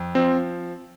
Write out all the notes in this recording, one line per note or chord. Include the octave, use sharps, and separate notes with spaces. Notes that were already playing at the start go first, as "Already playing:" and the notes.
Already playing: F2
F3 C4